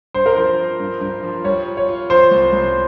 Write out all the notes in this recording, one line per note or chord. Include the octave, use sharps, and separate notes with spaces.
G2 C5
A#4
F3 C5
F3
G2
G2
F3
G3 C#5
F4
C#5
F4
F3 C5
C2
C2